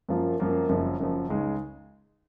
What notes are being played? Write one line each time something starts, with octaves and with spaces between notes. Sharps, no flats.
F#2 F3 A#3 F4
F#2 F3 A#3 F4
F#1 F#2 F3
F#1 F#2 F3
C#2 C#3 G#3 D#4